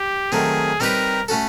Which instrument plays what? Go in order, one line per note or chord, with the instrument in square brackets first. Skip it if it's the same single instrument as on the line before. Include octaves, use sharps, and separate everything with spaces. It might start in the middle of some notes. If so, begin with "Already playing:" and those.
Already playing: [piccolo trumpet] G4
[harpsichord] D#3 F#3 A3 C4 [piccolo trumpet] G#4
[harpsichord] G3 C4 D#4 G4 B4 [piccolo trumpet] A#4
[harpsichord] A3 C#4 F#4 A4